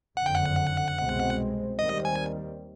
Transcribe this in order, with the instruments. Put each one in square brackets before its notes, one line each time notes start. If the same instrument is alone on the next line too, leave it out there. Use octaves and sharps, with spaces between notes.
[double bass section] F#1 F2 D3 [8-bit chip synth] F#5
[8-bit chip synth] G5
F#5
[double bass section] C2 B2 G#3 C4
[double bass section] D#2 D#3 G3 C4 [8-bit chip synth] D#5
[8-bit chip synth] G#5